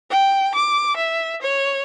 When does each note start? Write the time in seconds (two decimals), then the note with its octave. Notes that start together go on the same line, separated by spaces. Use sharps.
0.10 G5
0.54 D6
0.97 E5
1.42 C#5